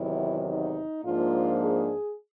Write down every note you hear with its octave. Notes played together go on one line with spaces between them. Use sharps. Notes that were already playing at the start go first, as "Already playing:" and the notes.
Already playing: E2 C3 D#3 F#3 E4
D#4
G#2 F3 A#3 D4 F4
G#4